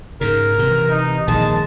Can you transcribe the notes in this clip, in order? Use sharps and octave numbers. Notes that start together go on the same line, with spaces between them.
G#2 C#3 A#4
C3 E3
D#4
A#1 D#3 G#3 A5